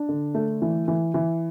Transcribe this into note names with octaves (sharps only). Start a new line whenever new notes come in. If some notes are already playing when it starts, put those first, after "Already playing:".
Already playing: D4
D3
A3
E3
E3
E3